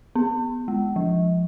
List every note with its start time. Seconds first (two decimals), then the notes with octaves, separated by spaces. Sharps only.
0.15 B3
0.68 G#3
0.96 F3